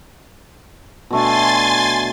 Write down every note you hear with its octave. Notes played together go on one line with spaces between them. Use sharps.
B2 A3 D4 G#5 C6 A6